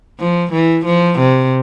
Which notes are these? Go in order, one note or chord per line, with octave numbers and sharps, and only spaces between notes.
F3
E3
F3
C3